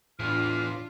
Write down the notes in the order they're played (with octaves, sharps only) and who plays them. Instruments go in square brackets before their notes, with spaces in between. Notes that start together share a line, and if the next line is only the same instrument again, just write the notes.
[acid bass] A2 [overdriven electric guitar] E3 G#4 [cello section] D4 F4 [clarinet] F6